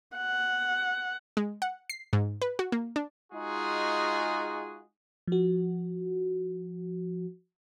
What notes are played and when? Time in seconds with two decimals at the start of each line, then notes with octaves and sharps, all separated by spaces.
0.17 F#5
1.37 G#3
1.62 F#5
1.90 C7
2.13 G#2
2.42 B4
2.59 F#4
2.72 A#3
2.96 D4
3.33 G#3 D#4 F4 F#4 G#4
5.28 F3 F#4